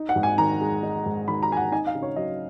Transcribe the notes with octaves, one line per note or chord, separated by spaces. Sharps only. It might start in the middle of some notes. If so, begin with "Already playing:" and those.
Already playing: D#4
F#5
G#2
G#5
D#3 A#5
G#3
D#4
G#2
D#3 B5
A#5
G#3 G#5
F#5
D#4 G#5
F5
C#3
C#5
F#3 D#5